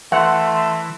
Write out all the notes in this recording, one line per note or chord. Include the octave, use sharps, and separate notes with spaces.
E3 A3 F#5 C6